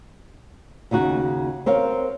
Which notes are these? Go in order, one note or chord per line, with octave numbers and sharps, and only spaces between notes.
D#2 C#3 D#4 F#4
C4 A#4 C#5 F5